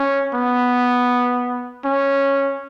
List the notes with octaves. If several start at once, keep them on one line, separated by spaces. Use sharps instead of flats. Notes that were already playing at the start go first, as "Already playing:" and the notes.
Already playing: C#4
B3
C#4